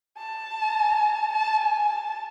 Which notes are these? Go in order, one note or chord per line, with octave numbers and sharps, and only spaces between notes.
A5
A5
G#5
A5